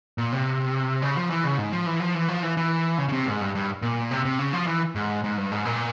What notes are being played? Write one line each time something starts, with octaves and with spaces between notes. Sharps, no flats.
A#2
C3
C#3
F3
E3
C#3
G#2
F3
E3
F3
E3
F3
E3
E3
C#3
C#3
C3
G#2
G2
G2
A#2
C3
C3
C#3
F3
E3
G#2
G#2
G2
G#2
A#2